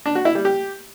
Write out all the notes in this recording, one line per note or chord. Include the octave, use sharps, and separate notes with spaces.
D4
F#4
E4
G3
G4